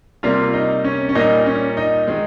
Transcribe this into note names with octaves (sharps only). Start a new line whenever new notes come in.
C3 G3 A#3 F4
D#4
C#4
C#4
A#2 G3 A#3 D#4
C#4
D#4
D#3 G#3